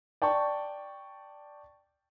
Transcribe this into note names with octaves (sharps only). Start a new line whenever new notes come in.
D5 G5 A5 C#6